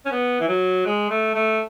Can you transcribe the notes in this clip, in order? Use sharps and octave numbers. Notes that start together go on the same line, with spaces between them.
C#4
B3
E3
F#3
G#3
A3
A3